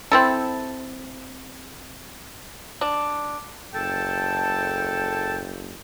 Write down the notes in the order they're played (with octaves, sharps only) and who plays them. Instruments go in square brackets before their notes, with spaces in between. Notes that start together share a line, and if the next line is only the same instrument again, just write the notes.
[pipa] C4 E4 A4
D4
[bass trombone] F#1 [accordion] A4 A5 [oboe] G5